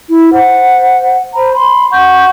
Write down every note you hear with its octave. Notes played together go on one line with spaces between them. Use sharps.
E4
C5 F#5
C5 A#5 B5
B5 C6
F#5 C#6 G6